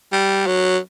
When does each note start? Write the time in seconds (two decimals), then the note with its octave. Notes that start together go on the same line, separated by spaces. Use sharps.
0.12 G3
0.47 F#3